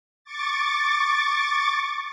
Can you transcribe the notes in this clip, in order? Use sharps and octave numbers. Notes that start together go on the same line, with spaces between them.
C#6 D6 A6